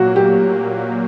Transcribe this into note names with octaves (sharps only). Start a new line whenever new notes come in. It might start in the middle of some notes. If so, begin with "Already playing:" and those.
Already playing: A#2 F#3 A#3 F#4
G4